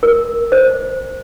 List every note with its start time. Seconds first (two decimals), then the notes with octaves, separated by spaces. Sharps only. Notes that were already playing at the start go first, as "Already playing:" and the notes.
0.03 A#4
0.52 C5